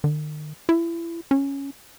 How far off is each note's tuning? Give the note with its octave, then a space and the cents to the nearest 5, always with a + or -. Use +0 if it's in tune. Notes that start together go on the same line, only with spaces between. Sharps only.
D#3 -45
E4 +30
C#4 +0